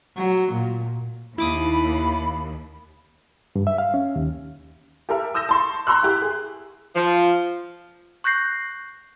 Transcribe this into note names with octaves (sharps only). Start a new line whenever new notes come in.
F#3
A#2
D#2 E4 B5 D6 D#6
G2
E5
F5
C#4
D#2
G4 A4 A#4 E5
D#6 E6 G6 A#6 E7
A5 C6 C#6
A#5 C6 C#6 E6 F#6
E4 G4
G#4
F3
C#6 F#6 G6 A#6 C7